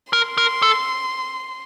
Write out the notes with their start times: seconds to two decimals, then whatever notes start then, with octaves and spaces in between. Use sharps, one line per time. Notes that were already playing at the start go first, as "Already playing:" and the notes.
0.13 A#4 C6
0.38 A#4
0.62 A4